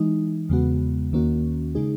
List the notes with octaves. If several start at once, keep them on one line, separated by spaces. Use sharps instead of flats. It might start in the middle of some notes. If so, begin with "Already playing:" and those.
Already playing: E3 G#3 D#4
E2 C#3 G#3 B3 F#4
D#2 D#3 A#3 C#4 F#4
C#3 G#3 D#4 G#4